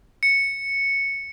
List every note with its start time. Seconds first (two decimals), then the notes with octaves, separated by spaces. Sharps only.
0.23 C#7